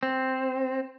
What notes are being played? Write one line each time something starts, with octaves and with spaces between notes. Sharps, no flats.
C4